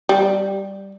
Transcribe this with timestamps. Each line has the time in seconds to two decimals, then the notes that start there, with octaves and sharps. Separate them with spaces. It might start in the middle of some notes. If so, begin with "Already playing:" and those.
0.09 G3